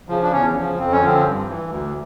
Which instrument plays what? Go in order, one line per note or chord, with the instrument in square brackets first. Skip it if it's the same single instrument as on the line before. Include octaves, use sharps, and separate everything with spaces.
[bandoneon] C#3 F3
D4
E2 C#4
C#3
F3
F2 C4
C#4
D3 F3 C4
G2
E3
D2